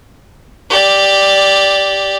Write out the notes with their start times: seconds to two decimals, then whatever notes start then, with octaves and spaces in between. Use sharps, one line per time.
0.70 G4 D5